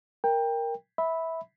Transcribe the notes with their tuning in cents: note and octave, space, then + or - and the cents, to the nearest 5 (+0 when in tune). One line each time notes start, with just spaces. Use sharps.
A#4 +0 G5 +20
E5 -20 B5 +0